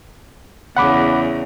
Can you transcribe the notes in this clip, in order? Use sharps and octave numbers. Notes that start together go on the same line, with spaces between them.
E2 C#3 F#5 B5 D6